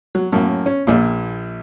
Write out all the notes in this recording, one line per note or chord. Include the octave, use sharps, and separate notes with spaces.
F#3
F#2 A2 A#3
C#4
A#1 A#2